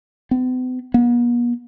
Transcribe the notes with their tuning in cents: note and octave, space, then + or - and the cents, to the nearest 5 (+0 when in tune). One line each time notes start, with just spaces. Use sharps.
B3 +45
B3 -45